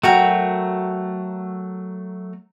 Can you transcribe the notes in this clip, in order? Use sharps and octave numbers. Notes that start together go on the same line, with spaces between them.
F#3 A3 F#4 A#4 G5